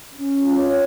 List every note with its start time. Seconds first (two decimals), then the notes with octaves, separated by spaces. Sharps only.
0.13 C#4
0.34 F4
0.56 C#5